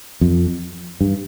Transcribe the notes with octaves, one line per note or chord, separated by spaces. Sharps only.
F2
G2